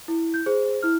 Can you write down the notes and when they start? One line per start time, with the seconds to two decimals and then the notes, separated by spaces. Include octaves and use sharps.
0.08 E4
0.34 G6
0.46 G#4 C5
0.83 E4 F6